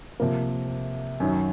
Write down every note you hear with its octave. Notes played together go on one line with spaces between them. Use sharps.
C3 F3 A#3
F#2 D#3 F#3